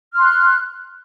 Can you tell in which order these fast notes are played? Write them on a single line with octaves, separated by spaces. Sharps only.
F6 C6 F#6